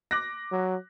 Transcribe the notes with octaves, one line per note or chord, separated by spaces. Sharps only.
D6 F#6 A#6
F#3